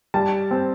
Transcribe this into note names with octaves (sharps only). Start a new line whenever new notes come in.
G3 A5
C4